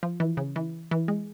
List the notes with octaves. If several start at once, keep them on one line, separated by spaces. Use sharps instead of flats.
F3
E3
C#3
E3
E3
G#3